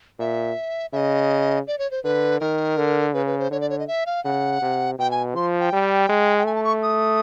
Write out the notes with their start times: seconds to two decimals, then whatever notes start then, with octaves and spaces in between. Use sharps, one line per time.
0.19 A#2 E5
0.93 C#3 D#5 E5
1.67 D5
1.79 C#5
1.91 C5
2.04 D3 B4
2.40 D#3 A#4
2.77 D3
3.14 C#3 B4
3.26 B4
3.39 C5
3.51 D3 C#5
3.61 D5
3.70 C#5
3.79 D#5
3.87 E5
4.06 F5
4.24 C#3 F#5
4.62 C3
4.99 B2 G5
5.11 G#5
5.35 F3 C6
5.60 G5
5.72 G3
6.09 G#3
6.38 G5
6.46 A3 G#5
6.55 A5
6.64 C#6
6.83 D#6